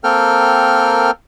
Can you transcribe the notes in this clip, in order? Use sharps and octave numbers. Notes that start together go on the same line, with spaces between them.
A#3 C4 A4 A#4 G5 F6